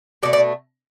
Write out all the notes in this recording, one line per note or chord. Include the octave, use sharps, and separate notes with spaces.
B2 A3 D5
D5